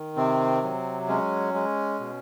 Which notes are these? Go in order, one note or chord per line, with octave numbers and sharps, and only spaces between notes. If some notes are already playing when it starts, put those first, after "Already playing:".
Already playing: D#3
C3 C4
F#3
G#3 C#4
G#3
B2